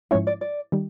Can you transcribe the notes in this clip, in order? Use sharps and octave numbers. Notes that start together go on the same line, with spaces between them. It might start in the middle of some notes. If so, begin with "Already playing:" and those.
G#2 F3 G#3 C#4 E4 C#5
D5
D5
D#3 G3